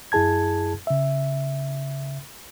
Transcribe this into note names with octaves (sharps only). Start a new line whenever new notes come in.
F#2 E4 G#4 A5 G#6
C#3 E5